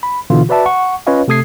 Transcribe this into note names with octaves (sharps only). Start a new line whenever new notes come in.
B5
B2 D3 E3 F4
F#4 B4 D5 E5 A5
F#5 C#6
C#4 F4 B4 C#5 D#5 F5
C3 A3 A4 D#6 G#6 C7